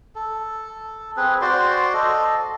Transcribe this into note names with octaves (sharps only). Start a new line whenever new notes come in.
A4
C4 G#4 B4
F#4 C5 D5 C6
A4 D#5